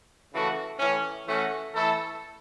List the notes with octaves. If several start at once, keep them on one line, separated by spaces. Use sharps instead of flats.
C#3 E3 A3 F#4 A4
A2 E3 C#4
E3 A3 C#4 F#4
E3 A3 E4 A4